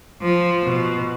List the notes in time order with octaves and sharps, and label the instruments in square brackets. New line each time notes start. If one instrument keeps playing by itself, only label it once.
[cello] F3
B2